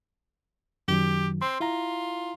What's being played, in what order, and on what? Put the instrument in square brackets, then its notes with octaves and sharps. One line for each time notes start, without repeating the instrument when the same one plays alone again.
[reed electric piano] F#2 D#3 F#3 [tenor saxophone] G4
[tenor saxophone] C4 [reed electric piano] C6
[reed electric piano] E4 A#5 [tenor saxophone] F4